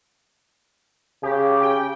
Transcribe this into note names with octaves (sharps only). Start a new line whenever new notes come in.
C#3 G4
G5